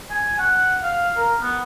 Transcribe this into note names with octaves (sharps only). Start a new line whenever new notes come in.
G#5
F#5
F5
A#4
B3